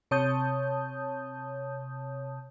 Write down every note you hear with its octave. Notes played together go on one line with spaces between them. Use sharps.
C3 C#5 A5 D#6 G6